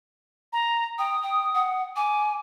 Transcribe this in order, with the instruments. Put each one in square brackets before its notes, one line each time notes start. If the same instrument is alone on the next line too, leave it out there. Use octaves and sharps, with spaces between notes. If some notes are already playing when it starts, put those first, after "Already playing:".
[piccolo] A#5
[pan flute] G5 [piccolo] D#6
[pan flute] G5
F#5
[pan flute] G#5 [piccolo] D6